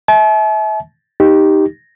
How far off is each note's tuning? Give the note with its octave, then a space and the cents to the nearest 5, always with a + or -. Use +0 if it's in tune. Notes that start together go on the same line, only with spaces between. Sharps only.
E5 -25 A5 -45
D#4 +0 G4 +0